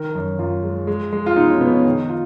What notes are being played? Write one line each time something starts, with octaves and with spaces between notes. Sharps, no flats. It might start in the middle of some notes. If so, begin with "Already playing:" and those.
Already playing: D#3 A#4
F#2
F#2 F4
G#3
G#3
G#3
F4
B2 D#4
C#4
B2 B3
C#4
D#3 D#4
F4